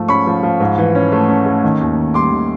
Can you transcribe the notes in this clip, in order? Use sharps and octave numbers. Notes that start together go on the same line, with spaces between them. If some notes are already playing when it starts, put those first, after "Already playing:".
Already playing: G#2 F3 A3
C#4 B5 C#6
F3
F3
G#2
E3
C#4
A3
C#4
A3
D#3
D#2
D#2
G3 C6 D6
D#3